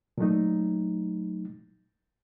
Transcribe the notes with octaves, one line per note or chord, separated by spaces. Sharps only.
A#2 F#3 A3 D#4